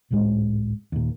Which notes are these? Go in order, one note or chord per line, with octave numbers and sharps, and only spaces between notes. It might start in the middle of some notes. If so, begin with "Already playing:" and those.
G#1 C#2 A2 G#3
D#2 A#2